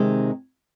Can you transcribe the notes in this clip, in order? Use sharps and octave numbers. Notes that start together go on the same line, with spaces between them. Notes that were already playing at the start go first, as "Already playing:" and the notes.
Already playing: C3 D#3 G#3 C4 D#4